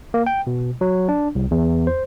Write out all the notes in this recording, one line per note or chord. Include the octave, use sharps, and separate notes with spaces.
A#3
G5
B2
F#3
D4
C2
E2
C5